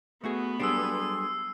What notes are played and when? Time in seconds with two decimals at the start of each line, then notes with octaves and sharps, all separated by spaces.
0.24 A3 B3 F#4 G#4 B4
0.60 F#3 G3 D4 G#4 A4 C6 E6 C7